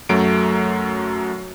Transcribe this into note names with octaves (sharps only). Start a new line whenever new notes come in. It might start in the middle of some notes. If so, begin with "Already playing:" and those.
F#2 F#3 A3 D7